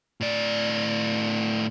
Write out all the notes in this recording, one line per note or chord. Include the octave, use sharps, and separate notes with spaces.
A2 D5